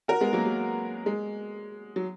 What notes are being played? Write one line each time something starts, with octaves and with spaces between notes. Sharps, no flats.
F#4 A#4
G#3 B3
F#3 A#3
F#3
G#3
F#3